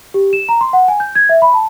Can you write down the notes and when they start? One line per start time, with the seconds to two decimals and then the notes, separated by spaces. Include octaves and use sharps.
0.14 G4
0.33 E7
0.49 A#5
0.61 C6
0.73 F#5
0.88 G#5
1.00 G6
1.15 G#6
1.29 E5
1.42 B5
1.54 A5